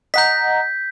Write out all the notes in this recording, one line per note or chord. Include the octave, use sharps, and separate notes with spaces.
D#5 F#5 A#5 G6 B6